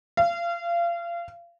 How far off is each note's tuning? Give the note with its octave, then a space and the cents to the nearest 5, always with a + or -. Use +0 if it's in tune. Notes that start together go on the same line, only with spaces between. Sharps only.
F5 -30